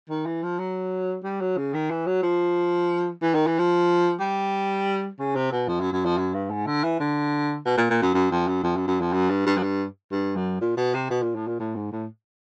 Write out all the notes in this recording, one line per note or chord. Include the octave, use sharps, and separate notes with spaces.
D#3
E3
F3
F#3
G3
F#3
C#3
D#3
E3
F#3
F3
E3
D#3
E3
F3
G3
C#3
C3
B2
F2
F#2
F#2
F2
F#2
G2
G#2
D3
E3
D3
B2
A#2
A#2
F#2
F#2
F2
F#2
F2
F#2
F#2
F2
F#2
G2
G2
F#2
G2
G2
F#2
A#2
B2
C3
B2
A#2
A2
A#2
A2
G#2
A2